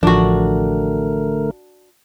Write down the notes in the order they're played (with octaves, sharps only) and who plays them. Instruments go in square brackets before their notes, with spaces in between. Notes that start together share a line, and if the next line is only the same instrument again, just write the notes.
[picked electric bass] A1 F3 [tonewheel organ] D3 A3 A#4 [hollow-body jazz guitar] D4 F#4